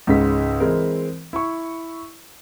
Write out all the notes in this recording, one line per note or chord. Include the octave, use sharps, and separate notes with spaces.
C#2 G#2 C#3 G#3 B6
E3 G#3 C4 A#4
E4 C#6